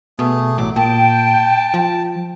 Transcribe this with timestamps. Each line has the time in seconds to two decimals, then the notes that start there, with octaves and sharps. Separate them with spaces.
0.19 B2 A3 G#4
0.58 A1 F#3 D6
0.76 A#2 G5 A5
1.74 F3